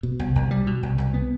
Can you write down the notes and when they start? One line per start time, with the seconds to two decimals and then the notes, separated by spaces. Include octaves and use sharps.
0.03 B2
0.19 C2
0.35 C2
0.51 G3
0.67 B2
0.83 C2
0.98 C2
1.14 B3